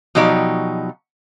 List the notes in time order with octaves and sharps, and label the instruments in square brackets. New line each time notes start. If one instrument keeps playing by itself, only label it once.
[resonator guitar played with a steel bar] B2 F3 F#3 D#4 G4 D5